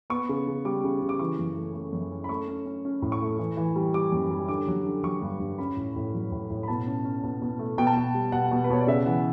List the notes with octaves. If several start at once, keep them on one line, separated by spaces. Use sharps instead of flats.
B3 C#6
C#3
C#3
G3 D6
C#3
C#3
D6
E3 C#6
F#2
A3
A3
F#2
C#4
B5
A3 C#6
C#4
C#4
C#4
A2
C#6
A3
E3
E3
G3
G3 D6
F#2
G3
D3 D6
F#3
D3
F#3 C#6
G2
G2
C#4 B5
A2
A2
F#3
A2
A2
B5
B2 A5
C#4
C#4
B2
B2
A3
B2 G5
A5
B2 G5
G3
B2 F#5
B2
B4
B2 C#5
D5
C#3 E5
E3 F#5